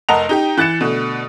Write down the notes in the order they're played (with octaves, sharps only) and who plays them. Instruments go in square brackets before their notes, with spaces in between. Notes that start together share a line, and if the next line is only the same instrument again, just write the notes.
[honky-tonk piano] F1 A#4 D#5 F#5 A5 F7
D#4 G4 G5
E3 F#6 A6 C#7 E7
B2 D3 A3